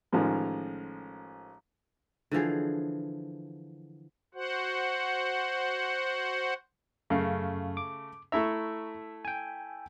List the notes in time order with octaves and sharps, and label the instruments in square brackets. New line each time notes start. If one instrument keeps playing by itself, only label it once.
[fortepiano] A1 D#3 F3 G#3
[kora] D3 E3 F3 G#4
[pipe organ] F#4 C5 F#5
[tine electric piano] F#2 F5 [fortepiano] C#3 A3
[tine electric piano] D6
[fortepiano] A3 E4 E5 [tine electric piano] A#5 C#6
[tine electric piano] G5 G#5